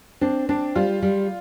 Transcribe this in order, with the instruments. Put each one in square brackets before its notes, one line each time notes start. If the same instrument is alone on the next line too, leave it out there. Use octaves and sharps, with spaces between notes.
[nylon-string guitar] C4 [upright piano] D4
[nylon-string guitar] C4 [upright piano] D4
[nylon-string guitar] G3 [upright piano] F4
[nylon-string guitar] G3